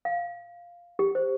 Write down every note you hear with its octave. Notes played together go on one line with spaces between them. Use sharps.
F5
G4
C5